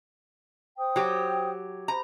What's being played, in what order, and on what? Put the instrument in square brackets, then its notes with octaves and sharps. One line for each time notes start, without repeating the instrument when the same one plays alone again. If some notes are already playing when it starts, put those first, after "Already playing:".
[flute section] C5 G5 D#6
[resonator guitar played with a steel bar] F#3 G4
[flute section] C5 B5 [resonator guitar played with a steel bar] A#5